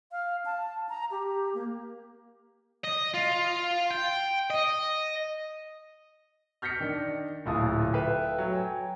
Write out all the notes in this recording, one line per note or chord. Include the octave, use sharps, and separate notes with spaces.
F5
A5
A#5
G4
A#3
D#5
F4
G5
D#5
F6 G6 A#6 B6 C#7
D#3 D4
D1 A#2 E4 F4 A5 D#6
A4 B4 E5 F5 G5
F#3
G5 G#5